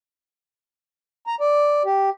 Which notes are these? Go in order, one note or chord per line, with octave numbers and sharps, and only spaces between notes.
A#5
D5
G4